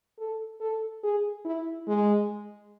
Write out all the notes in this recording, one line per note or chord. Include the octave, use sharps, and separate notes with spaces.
A4
A4
G#4
E4
G#3